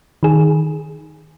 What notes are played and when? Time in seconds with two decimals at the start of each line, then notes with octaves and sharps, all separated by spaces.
0.23 D#3 G#4